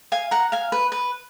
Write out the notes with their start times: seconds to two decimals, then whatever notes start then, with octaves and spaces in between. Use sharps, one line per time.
0.12 F5 G#5
0.31 F#5 A#5
0.52 F5 G#5
0.72 B4
0.92 B4